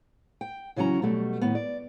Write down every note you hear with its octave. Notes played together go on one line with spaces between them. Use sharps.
G5
C#3 E3 F#3 C#4 A#5
B2 F#3 G3 A3
A2 D#3 B3
D5